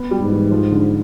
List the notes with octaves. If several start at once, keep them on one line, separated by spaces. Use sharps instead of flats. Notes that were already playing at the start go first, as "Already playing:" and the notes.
Already playing: B3
G3
G#2
E3
F3
D3